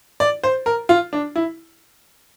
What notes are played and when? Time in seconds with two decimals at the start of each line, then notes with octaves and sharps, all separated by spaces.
0.20 D5
0.43 C5
0.66 A#4
0.89 F4
1.13 D4
1.36 E4